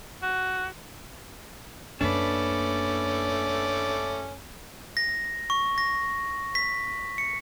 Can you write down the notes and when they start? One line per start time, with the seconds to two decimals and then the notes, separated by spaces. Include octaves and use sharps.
0.22 F#4
2.01 F#2 A3 A#3 C#4 D4 B4 D5
4.97 A#6
5.50 C#6
5.78 A#6
6.55 B6
7.18 C#7